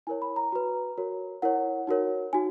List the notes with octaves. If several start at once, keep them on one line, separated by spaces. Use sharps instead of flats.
E4 A#4 C#5 G#5
B5
A#5
F#4 B4 A#5
F#4 A#4 C#5
E4 A#4 C#5 F#5
D#4 F#4 A#4 C#5
D#4 F#4 G#5